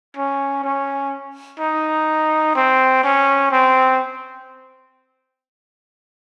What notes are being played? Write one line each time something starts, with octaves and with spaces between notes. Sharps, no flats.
C#4
C#4
D#4
C4
C#4
C4